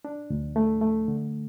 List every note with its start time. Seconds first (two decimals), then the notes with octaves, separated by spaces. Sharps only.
0.05 D4
0.30 D2
0.56 A3
0.81 A3
1.08 D3